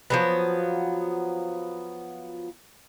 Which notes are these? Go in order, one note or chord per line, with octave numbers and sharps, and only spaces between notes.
F3 F#3 B3